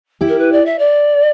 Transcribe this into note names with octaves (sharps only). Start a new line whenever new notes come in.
E4 G4
A#4
B4
D5
E5
D5